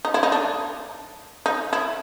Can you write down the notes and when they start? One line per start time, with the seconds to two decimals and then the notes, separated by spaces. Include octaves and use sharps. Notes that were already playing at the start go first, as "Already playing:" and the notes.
0.05 D#4
0.14 E4
0.23 D#4
0.32 D4
1.46 D#4
1.73 E4